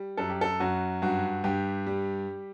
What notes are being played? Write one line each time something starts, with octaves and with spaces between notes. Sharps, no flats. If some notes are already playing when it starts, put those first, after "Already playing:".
Already playing: G3
F#2 A4
G4
A4
F#2 F#4
G2 F#4
G2 G4
G3